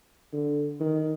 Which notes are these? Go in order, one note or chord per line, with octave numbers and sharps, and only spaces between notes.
D3
D#3